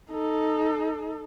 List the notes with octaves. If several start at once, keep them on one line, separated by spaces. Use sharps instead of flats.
D#4 A4